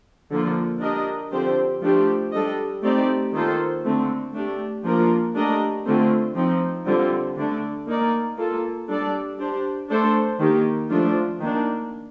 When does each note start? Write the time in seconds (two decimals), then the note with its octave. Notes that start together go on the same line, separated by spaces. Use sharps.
0.31 D3 F3 A#3 F4
0.81 D4 G4 A#4 D#5
1.32 D3 F3 C4 G4 C5
1.82 F3 A3 D4 G4 C5
2.32 G3 D4 A4 D#5
2.82 A3 C4 D#4 G4 D5
3.34 D#3 A#3 F4 A4 C5
3.84 D3 A3 C4
4.34 A3 D4 G4
4.84 F3 A#3 D4 F4 A#4
5.35 A3 D4 G4 A#4 D#5
5.86 D3 A3 C4 F4
6.36 F3 C4 D#4
6.86 D3 G3 C4 F4
7.37 D3 A3 D4
7.87 A#3 D#4 A#4 D5
8.38 A#3 F4 A4
8.89 G3 D4 A4 D5
9.39 D4 G4 C5
9.90 A3 D4 A4 C5
10.40 D#3 A#3 D#4 G4
10.90 F3 A3 D4 F4
11.40 D#3 A#3 D4